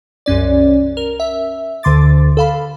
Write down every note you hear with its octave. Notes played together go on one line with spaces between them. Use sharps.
C2 F#2 C#4 D5
A#4
E5
D2 D3 C6 D6 A6
A4 F5 B5